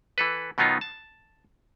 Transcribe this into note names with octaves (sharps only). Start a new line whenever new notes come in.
E3 A4 B4
B2 D#3 F#3 B3 D#4 F4
A5